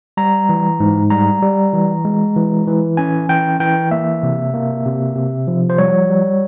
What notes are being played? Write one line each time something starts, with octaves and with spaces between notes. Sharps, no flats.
G3 A#5
E3
G#2
G3 A#5
G3
E3
G#3
E3
E3
C#4 G#5
E3 G5
E3 G5
A#3 E5
C3
A#3
C3
C3
F3
C5
G3 C#5
G3